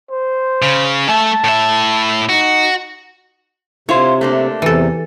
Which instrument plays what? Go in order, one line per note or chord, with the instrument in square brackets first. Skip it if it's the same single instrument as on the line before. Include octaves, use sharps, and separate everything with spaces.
[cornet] C5
[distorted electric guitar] C#3
[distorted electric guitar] A3 E5 [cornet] A5
[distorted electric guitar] A2 E5
[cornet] D#4 [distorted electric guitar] F#4
[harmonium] C3 [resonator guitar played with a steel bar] E4 F4 C5 [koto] C#5
[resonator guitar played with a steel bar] A3 A#3 D4
[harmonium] E2 C3 [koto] E3 A4